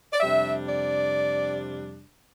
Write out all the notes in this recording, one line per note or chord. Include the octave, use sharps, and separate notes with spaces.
D5
F2 C3 G3 D4 E5
D5